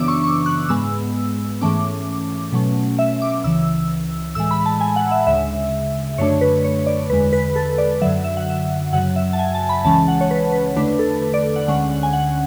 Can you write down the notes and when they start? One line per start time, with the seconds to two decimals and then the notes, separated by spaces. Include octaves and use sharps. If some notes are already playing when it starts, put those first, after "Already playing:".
Already playing: F#2 C#3 E3 B3 D4 D6 E6
0.08 C#6
0.24 C#6
0.46 F#6
0.69 G#2 G#3 B3 E6
1.61 G#2 E3 A3 C#4 D6
2.53 B2 F#3 A3 C#4
2.99 E5
3.22 D6
3.43 C#2 C#3 E3 E6
4.35 A2 E3 G#3 E6
4.51 B5
4.66 A5
4.81 G#5
4.96 F#5
5.11 E5
5.27 D2 C#3 G#3 E5
6.18 F#2 D3 A3 D4 C#5
6.41 B4
6.65 C#5
6.87 D5
7.10 E2 D3 G#3 B4
7.33 B4
7.56 A4
7.78 D5
8.02 F#2 D3 F#3 E5
8.24 E5
8.37 F#5
8.50 E5
8.93 F#2 C#3 F#3 F#5
9.16 E5
9.33 A5
9.39 G#5
9.55 A5
9.69 B5
9.84 C#2 C#3 E3 G#3 C#4 A5
10.08 F#5
10.21 C#5
10.31 B4
10.53 B4
10.76 E2 D3 A3 D4 B4
10.99 A4
11.22 B4
11.34 D5
11.56 F#5
11.68 D2 D3 G#3 C#4 F#5
11.91 F#5
12.03 G#5
12.13 F#5